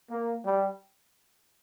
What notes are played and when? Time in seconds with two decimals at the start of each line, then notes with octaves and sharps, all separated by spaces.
0.11 A#3
0.45 G3